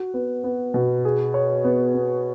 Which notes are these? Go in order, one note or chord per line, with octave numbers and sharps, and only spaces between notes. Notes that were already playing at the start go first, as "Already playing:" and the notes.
Already playing: F#4
B3
B3
B2
G#4
C#5
B3
B3